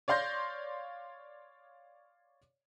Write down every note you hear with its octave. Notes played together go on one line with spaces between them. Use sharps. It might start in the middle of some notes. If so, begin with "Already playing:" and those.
C#5 D5 F5 C6 G6 A#6